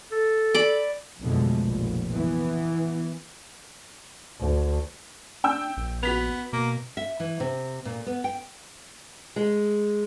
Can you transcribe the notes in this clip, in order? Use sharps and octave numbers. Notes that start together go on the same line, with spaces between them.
A4
D5 B5 D6
B1 F2 B2 D3 G#3 A3
F1 A#1
E3 B3
D2
D4 G5 E6 G6
A#1
B3 F#4 B6 F7
B2 A#3
E5
E3
C3
A#2
B3
G5
G#3